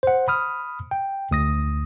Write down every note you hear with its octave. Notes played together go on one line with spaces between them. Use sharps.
C5 F#5
B5 D#6 F6
G5
D2 D#6 A#6